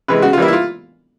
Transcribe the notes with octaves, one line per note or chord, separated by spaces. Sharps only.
C3 E3 G#3 B4
C#3 F#4
F4
E3 G3 A#3 E4
E4
F4